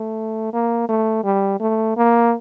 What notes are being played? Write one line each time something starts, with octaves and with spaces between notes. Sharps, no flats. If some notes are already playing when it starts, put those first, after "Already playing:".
Already playing: A3
A#3
A3
G3
A3
A#3